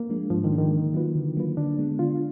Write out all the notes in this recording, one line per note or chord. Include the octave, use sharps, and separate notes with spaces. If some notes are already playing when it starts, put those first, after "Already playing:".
Already playing: A#3
F3 G#3 D4
G#2 F3
D#3
F3 G#3 D4
D#3
D3
F#3 A#3 F4 B4
D3
F#3 A#3 F4 B4
D3 D4
G#3 B3
D3 F4